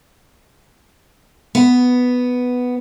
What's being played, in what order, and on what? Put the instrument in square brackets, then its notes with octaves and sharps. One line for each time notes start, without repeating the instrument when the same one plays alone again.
[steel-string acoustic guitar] B3